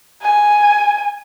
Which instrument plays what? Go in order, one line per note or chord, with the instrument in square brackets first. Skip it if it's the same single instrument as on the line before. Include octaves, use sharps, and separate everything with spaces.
[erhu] G#5